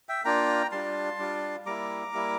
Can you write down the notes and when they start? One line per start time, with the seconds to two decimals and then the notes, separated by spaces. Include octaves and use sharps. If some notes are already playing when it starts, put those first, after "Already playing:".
0.09 E5 G5
0.25 A#3 D4 F4 G5 A#5
0.72 G3 D4 F4 A5 C6
1.19 G3 D4 F4
1.65 G3 A#3 E4 A#5 D6
2.13 G3 A#3 E4